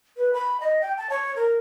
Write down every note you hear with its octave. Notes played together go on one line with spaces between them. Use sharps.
B4
B5
D#5
G5
A5
C#5
A#4